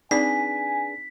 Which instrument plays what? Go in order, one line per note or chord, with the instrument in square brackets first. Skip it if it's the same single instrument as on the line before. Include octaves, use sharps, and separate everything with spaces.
[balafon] C4 D#4 D5 [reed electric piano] D4 G#4 B4 [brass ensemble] G#5 [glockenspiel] B6